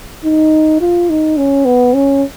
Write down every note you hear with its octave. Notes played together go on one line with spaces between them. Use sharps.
D#4
F4
D#4
C#4
B3
C#4